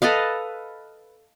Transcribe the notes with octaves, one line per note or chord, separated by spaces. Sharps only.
A4 B4 D#5 F5